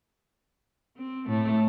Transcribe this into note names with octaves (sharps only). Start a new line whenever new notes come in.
C4
A2 A3